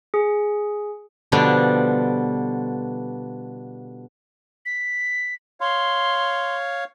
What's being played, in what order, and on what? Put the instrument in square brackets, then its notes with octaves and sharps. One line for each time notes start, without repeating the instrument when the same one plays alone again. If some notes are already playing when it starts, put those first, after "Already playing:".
[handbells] G#4
[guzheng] B2 D3 F3 G3 D4
[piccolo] B6
[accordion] C#5 F5 [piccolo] C6